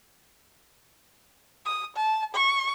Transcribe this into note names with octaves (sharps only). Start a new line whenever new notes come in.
D#6
A5
C#6